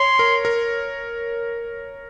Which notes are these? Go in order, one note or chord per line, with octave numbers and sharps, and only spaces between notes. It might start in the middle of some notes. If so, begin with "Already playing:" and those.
Already playing: C#5 C6
A#4
A#4